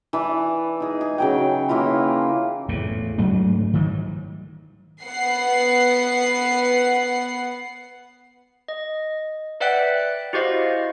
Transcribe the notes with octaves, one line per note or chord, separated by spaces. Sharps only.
E3 B4 D5 A5
D#4 G#4
G#4
C#3 F#3 G5
E3 A#3 E4 F4
E2 A2
G#2 F#3 A3 D4
D#3 F#3 G3
B3 F#5 C7
D#5
B4 D5 E5 F#5 G5 F#6
E4 F#4 G4 C5 D#5 F5